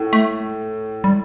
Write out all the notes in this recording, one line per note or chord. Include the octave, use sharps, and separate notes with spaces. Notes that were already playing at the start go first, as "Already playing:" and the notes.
Already playing: A2
A3
G3